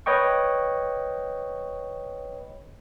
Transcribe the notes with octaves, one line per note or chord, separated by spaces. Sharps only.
B4 C#5 D#5 G5 C#6